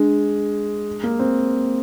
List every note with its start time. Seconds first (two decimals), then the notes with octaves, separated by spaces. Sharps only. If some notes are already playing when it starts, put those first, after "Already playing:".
Already playing: G#3 D4
1.04 A#3
1.19 C4